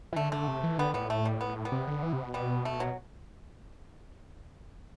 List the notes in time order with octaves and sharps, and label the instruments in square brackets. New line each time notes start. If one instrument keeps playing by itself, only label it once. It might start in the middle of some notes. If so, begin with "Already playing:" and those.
[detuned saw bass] E3
[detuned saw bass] D3 [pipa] A3
[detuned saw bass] D3 [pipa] A3
[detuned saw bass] C3
E3
[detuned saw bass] D3 [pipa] G3 B3
[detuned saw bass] A2 [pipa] G3 B3
[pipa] A3
G3
B3
G3 B3
[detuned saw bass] C3
D3
E3
C3
B2
[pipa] G3 B3
A3
F#3